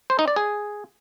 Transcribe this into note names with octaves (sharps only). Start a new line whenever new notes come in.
C5
D#4
D5
G#4